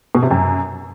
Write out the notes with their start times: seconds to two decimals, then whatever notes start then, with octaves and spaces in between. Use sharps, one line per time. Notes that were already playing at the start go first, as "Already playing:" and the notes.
0.15 B2
0.23 C3
0.31 F#2